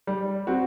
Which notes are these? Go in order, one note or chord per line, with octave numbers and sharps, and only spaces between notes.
G3
C4 F#4